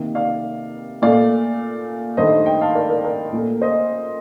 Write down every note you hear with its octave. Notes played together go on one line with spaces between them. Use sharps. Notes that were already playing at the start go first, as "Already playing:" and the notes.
Already playing: C3 D#3 A#3
D5 F5
A#2 A3 D5 F5
G2 D#3 A3 C5 D#5
D#5 G5
F5 A5
A#4 D5
A#4 D5
A#4 D5
A#2 A3
C5 D#5